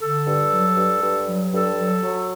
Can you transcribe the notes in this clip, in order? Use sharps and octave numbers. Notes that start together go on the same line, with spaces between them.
D3 A4
G2
F#3
G2
G2
F#3
G2 A4
F#3
F#3